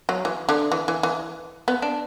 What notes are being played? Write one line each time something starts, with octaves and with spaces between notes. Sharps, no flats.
F#3
E3
D3
E3
E3
E3
B3
D4